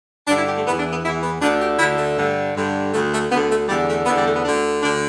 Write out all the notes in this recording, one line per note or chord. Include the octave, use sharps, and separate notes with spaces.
G2 D3 D4
E4
G4
A3
E2 E3 B3
D4
B3
E2 E3 E4
B3
D2 D3 D4
G4
D2 D3 E4
A3
G2 D3
G2 D3
D2 D3 A3
A3
D2 D3 B3
A3
E2 D3 G3
A3
E2 D3 B3
G3
A3
B3
D2 D3 D4
D2 D3 D4